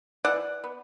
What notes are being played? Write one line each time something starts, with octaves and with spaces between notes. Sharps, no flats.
E3 D5 F#5
B3